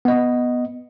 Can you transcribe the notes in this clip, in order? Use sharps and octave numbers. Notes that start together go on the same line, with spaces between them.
B3 D#5